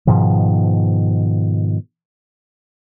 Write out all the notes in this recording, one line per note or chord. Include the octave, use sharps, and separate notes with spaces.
G#2 B2 D#3 F3